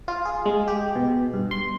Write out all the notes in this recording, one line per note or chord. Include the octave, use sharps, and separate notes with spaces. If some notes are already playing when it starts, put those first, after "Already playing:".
F4
G#4
G#3
G4
B2
G2
C6